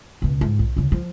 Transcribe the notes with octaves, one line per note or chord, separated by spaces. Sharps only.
C#2 B2
G#2
B1
D#2 C#3
F3